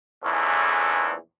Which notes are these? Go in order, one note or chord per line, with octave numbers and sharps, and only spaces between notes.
A#1 E2 G#2 E3 C#4 A4